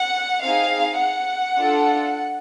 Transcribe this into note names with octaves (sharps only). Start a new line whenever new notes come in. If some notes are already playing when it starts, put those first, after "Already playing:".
Already playing: F#5
C4 D#4 G#4 F5
F#5
D4 F4 A4